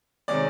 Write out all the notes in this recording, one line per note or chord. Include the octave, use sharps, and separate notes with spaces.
C3 D#3 G#3 C#4 D5 D6